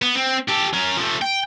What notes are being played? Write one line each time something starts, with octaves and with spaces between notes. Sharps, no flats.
B3
C4
G4 A4
C#4 A#4
F3 A3
G5